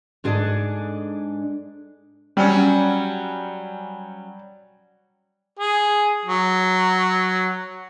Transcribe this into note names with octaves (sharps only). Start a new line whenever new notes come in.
G#2 D4 G#4 A4 D5 D#5
F#3 G3 C#4
G#4
F#3